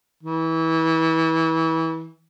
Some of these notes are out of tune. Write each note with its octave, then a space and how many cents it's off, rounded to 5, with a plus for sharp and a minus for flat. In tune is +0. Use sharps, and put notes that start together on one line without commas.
E3 -25